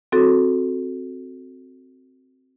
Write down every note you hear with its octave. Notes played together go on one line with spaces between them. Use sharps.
C4 F#4 A4